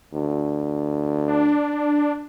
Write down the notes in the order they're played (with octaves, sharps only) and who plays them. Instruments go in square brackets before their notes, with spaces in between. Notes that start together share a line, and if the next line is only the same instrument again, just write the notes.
[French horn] D2
[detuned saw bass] D4